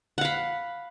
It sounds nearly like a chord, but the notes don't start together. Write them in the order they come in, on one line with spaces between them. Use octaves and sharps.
F#5 F5 B5